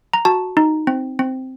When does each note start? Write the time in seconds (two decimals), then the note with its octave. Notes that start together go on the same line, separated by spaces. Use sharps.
0.14 A#5
0.25 F#4 A5
0.57 D#4
0.87 C4
1.19 C4